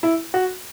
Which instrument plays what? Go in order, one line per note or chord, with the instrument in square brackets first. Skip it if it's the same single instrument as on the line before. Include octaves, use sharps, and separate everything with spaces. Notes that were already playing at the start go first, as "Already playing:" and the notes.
[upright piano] E4
F#4